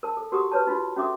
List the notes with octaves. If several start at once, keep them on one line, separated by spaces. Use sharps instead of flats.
A#4 A5
A4
F#4 G4 A#4 F#5 C#6 D#6
B4 C#5 A5
D#4 F4 F#4
C#4 F#4 A4 E5 D6 D#6